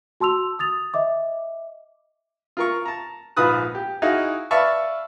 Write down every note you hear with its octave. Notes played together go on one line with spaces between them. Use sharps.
F#4 A5 C6 E6 F7
D#6 A6 F7
D#5 E5 D6
F4 A#4 C#6
A5 A#5
A#1 G#2 F4 B4 D#6 F#6
G4
D#4 E4 F#4 G#4 D#5 F5
B4 D5 E5 F5 A5 C#6